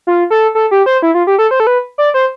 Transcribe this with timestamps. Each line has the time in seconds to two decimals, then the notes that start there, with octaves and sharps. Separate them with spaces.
0.07 F4
0.30 A4
0.55 A4
0.71 G4
0.86 C5
1.02 E4
1.14 F4
1.27 G4
1.39 A4
1.51 C5
1.60 A4
1.67 B4
1.98 D5
2.14 C5